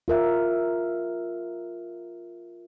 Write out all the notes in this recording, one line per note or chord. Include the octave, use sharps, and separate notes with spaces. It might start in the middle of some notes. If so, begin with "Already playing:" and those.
F4 A#4 E5